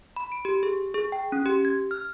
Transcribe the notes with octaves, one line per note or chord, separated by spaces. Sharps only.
B5
D7
G4
G#4
G#4
G5
C#4
G4
G#6
F6